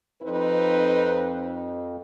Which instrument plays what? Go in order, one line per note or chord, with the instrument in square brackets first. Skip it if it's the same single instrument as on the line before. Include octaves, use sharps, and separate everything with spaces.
[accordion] F2 [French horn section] C4 D#4 B4